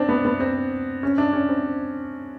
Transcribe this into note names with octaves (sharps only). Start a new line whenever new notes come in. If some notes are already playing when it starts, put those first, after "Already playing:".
Already playing: C4 D4
B3
B3
C4
C#4
D4
C#4
C4